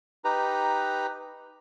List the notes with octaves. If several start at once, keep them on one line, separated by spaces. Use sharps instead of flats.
D#4 G4 B4 A#5